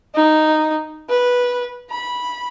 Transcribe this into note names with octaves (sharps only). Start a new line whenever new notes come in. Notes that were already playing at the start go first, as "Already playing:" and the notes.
D#4
B4
B5